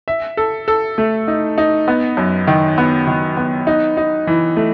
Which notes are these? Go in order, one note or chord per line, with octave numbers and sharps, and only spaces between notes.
E5
A4
A4
A3
D#4
D#4
B3
F#2
D#3
B3
D#3
B3
D#4
D#4
E3
A3